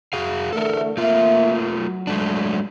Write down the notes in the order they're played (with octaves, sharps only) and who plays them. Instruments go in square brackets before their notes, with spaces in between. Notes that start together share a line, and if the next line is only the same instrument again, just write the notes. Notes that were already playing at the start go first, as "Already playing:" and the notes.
[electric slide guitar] F#4 G#4 F5
[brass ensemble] D3 E3 A3 [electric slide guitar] A4 A#4
[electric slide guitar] A3 F4 [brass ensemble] A#3 E5
[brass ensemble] F#3
[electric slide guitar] G#3 A3 D4